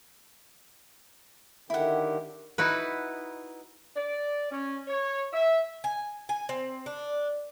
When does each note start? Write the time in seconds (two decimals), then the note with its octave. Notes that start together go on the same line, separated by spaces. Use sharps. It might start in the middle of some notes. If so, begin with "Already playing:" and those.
1.70 D3 D#3 E4 G4 F#5
2.58 D#4 E4 F#4 B4
3.95 D5
4.50 C#4
4.87 C#5
5.32 E5
5.84 G#5
6.29 G#5
6.49 C4
6.86 D4